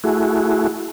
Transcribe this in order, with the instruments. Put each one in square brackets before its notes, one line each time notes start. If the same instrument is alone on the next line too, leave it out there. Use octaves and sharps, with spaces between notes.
[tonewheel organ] A3 E4 F#4 G#4